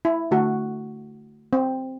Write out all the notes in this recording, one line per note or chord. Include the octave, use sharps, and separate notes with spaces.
E4
D3 A3 F#4 A4
C4